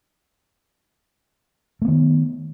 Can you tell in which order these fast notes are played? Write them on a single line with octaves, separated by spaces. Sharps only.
A3 B3 D#3